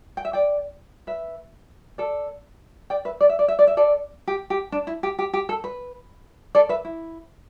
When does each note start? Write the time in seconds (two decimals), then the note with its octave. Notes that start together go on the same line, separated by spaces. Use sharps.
0.17 G5
0.25 E5
0.33 D5 G5
1.07 B4 E5
1.98 A4 D5
2.90 D5 G5
3.05 B4 E5
3.21 D5
3.29 E5
3.39 D5
3.48 E5
3.59 D5
3.67 E5
3.77 A4 D5
4.27 G4
4.50 G4
4.72 D4
4.87 E4
5.03 G4
5.19 G4
5.33 G4
5.49 A4
5.64 B4
6.55 A4 D5
6.69 B4 E5
6.85 E4